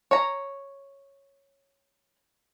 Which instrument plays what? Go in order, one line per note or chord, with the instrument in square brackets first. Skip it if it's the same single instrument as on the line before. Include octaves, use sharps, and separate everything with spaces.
[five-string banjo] C#5 A#5